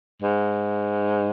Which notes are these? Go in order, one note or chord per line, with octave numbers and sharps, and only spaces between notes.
G#2